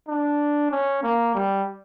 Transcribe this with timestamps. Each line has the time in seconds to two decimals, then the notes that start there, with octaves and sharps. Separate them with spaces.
0.08 D4
0.71 C#4
1.03 A#3
1.35 G3